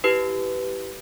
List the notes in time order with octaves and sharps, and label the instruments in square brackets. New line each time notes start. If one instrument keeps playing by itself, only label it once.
[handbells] E4 G4 B4